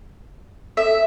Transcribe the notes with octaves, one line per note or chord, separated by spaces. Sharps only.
A4 E5